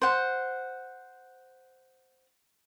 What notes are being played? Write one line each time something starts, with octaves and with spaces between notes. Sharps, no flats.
C5 F#5